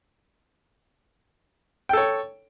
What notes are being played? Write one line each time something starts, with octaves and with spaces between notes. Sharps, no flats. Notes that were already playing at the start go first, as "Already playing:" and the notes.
A4 C#5 G5